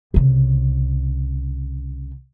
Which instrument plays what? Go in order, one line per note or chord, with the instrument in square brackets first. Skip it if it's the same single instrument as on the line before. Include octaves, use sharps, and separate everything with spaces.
[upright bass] C2 C#3